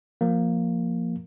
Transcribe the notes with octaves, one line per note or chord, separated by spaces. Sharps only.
F3 A#3